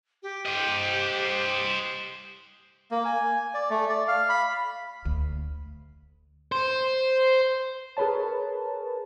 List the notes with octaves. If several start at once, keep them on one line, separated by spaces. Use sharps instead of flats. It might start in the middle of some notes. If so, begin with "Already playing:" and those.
G4
C5 D#5
A#3
G#5
D5
A3
D5
F5
B5
D2
C5
G#4 A#4 B4 C#5 A5